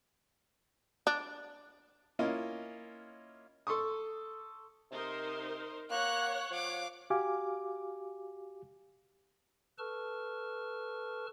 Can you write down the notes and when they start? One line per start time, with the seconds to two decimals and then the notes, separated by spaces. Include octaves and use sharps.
1.07 D4
2.19 A#3 C#4 E4 F4 D#5
3.67 A4 C6 C#6 D#6
4.91 C3 D#4 A#4 C5
5.91 A#3 C#5 F#5 F#6
6.51 F3 F5 D6
7.10 F#4 G4 F5 G#5 D6
9.78 A4 B4 A5 C#6 F6